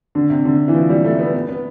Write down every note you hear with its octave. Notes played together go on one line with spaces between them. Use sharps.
D3
C3
D3
E3
F3
G3
A3
B3
B3
B3